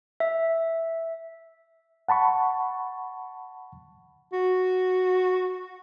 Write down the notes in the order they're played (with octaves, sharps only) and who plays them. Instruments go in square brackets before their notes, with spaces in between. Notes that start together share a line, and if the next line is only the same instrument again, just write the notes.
[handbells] E5
[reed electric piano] F#5 A5 B5 C#6
[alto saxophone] F#4